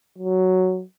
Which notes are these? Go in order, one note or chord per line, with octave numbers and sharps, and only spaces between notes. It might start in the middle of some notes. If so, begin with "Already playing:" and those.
F#3